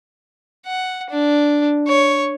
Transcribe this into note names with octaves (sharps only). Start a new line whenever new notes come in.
F#5
D4
C#5